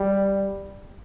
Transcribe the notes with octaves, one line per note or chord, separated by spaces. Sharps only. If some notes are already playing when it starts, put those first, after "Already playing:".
Already playing: G3